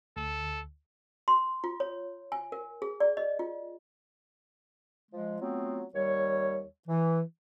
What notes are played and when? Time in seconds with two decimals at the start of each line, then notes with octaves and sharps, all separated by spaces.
0.17 D2 A4
1.28 C6
1.64 F4
1.80 C#5
2.32 G#5
2.52 A#4
2.82 G#4
3.00 D5
3.17 D#5
3.39 F4
5.11 F3 G#3
5.40 F#3 A3 B3 C4 F4
5.93 D#2 G3 C#5
6.87 E3